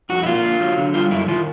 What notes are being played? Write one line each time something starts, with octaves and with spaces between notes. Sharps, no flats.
F2 F#4
E4
A#3 F4
D3
F#3
D3
G3 F4
F#2 E4
D#3 F4